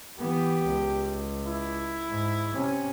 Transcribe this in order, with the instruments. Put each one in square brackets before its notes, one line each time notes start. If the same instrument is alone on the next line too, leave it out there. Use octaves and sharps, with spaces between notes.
[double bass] E3 B3 [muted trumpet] G4
[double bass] C#2
[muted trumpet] E4
[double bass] G#2
C3 C#4